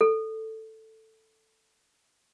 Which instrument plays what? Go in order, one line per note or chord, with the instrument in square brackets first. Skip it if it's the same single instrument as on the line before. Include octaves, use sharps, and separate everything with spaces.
[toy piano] A4